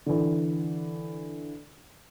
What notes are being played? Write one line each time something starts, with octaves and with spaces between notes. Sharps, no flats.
D3 E3